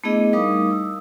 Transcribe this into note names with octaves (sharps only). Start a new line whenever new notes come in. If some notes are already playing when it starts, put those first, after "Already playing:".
A3 B3 D4 E4 G#4 D#5
G3 D#4 A#4 F5 D6 D#6
E6